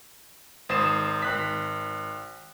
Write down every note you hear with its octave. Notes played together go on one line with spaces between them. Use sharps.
G#1 C5 D#6 A6 C7 E7
G#1 F#6 B6